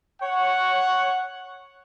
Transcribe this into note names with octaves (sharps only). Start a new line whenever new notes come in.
C#5 F#5